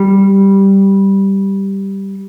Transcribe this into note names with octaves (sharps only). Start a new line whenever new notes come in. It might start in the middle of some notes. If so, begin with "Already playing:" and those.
Already playing: G3